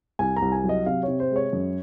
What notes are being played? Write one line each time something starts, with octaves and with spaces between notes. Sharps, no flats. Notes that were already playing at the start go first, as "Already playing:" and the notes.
C2 G#5
A#5
C2
G#5
F#3
D#5
C3 F5
C3 C#5
C5
G#3
C#5
F#2